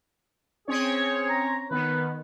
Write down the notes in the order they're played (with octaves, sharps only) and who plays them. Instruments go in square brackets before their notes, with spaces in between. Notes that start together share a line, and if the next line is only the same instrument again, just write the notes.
[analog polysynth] C4 C#4 C#5 [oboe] G#4
[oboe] A#5
[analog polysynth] D#3 B3 [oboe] B4